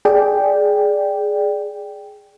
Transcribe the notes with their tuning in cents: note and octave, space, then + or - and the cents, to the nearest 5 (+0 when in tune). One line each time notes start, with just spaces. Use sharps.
G#4 +10 D5 +0 G5 +0